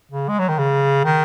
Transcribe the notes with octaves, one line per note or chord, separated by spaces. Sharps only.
C#3
G#3
F#3
D#3
C#3
D#3